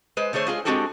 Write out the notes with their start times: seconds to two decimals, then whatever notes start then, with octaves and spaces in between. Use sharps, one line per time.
0.17 G#3 B4 C5
0.33 D3 A3 G#4 C5 C#5
0.47 G#3 F4 G#4
0.65 G#3 C4 D4 F#4 G4 A4